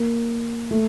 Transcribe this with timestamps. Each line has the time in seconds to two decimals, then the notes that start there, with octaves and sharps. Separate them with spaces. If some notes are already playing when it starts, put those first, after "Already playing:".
Already playing: A#3
0.71 A3